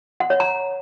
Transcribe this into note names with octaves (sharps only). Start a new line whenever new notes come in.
F#5
C#5
A#5